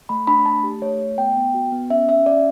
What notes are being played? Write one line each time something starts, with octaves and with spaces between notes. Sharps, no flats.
A3 B5
D4 B5
A3 A5
G4
A3 C#5
A3
B3 G5
B3
F#4
B3
C#4 E5
C#4 E5
C#4 D5